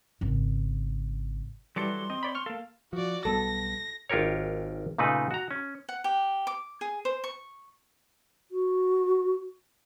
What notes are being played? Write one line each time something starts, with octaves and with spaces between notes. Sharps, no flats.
G#1 C#3
E3 F#3 G3 F#4 A4 C6 D6
C4 D#5
C#5 D5 B5
C#6 F6
A#3 A4 F5
F3 F#4 D5
B1 G3 B3 A4 A#6
G#1 F4 G4 A#4 C#5
A#2 C#3 A3 D#4 B4
F#4 A#5
C#4
F#5
G4
D6
G#4
C5
C#6
F#4